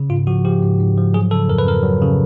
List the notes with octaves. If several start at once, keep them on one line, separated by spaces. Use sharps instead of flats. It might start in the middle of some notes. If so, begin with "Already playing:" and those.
Already playing: C#3
G#2 F4
F3 F#4
F3 G4
G#2
G#2
F3
F#3 G#4
C#3 A4
F2 A#4
B4
F2 A#4
F#3
C#3